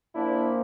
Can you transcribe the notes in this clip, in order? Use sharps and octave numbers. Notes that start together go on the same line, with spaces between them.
A#2 F3 A#3 D4 E4